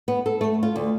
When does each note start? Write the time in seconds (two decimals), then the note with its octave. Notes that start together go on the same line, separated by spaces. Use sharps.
0.08 B3
0.26 A4
0.41 A3
0.63 F4
0.76 D2